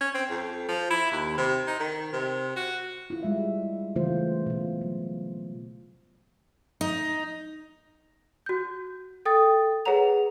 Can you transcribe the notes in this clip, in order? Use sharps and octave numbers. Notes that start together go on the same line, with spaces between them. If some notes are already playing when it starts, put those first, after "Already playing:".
C#4
C4
F2
F3
E4
D#2
C3
D#4
D#3
C3
F#4
E4 F4
G3 G#3 E5
C#3 E3 A3 F4 C5
B2 F4
F#3
D#4
F#4 G6
A4 G5 D#6 A6
G#4 B4 C#5 F#5 A#5 F7